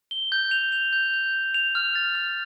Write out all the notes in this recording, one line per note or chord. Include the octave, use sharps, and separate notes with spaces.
G7
G6
F7
F7
G6
G6
F7
F7
F6
A6
F6